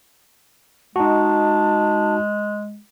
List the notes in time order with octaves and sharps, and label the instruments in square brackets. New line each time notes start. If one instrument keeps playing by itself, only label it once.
[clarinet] G#3 [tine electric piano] D#4 F#4 [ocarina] A5